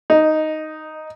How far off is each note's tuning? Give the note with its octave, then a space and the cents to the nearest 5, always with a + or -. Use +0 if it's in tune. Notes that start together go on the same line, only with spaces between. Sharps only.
D#4 +0 D#5 -25